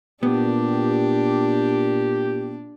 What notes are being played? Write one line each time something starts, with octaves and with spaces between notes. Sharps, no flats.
A#2 B3 D4 G4